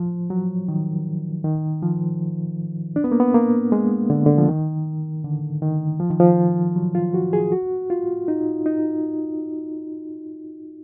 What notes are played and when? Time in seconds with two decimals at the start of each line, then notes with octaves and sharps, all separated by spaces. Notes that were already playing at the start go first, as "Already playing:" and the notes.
Already playing: F3
0.30 F#3
0.68 D#3
1.44 D#3
1.82 F3
2.96 D4
3.04 B3
3.12 A#3
3.20 B3
3.34 A#3
3.72 G#3
4.10 D3
4.26 D3
4.38 F3
4.48 D#3
5.24 D3
5.62 D#3
6.00 F3
6.10 D#3
6.20 F3
6.76 F#3
6.95 F4
7.14 F#4
7.33 G#4
7.52 F#4
7.90 F4
8.28 D#4
8.66 D#4